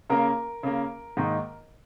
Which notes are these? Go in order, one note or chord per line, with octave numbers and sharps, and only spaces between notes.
C#3 A#3 A#4
C#3 A#3
G#2 D#3 A#3